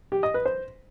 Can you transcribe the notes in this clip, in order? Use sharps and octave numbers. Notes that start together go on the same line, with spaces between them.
G4
D#5
B4
C5